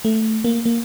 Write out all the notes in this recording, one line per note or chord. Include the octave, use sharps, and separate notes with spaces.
A3
A#3
A#3